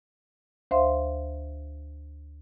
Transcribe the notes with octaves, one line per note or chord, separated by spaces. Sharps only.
D2 C5 E5 F5 C6